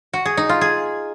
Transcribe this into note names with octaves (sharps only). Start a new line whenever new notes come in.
F#4
G#4
D#4
F4
G#4